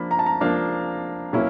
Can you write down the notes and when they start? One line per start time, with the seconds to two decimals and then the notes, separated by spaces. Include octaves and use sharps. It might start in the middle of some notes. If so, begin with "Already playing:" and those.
Already playing: F3 A#3 D4 B5
0.11 A#5
0.19 A5
0.26 A#5
0.41 F3 A#3 D4 F5
1.33 B2 F#3 A#3 C#4 E4